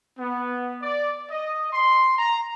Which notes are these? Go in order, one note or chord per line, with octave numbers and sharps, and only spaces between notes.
B3
D5
D#5
C6
A#5